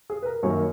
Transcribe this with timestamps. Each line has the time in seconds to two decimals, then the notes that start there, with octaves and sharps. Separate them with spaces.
0.10 G#4
0.22 B4
0.26 A#4
0.43 F#2 D#3 F#3 A#3 C#5